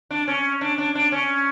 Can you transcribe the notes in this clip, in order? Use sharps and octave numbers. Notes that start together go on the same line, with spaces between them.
D4
C#4
D4
D4
D4
C#4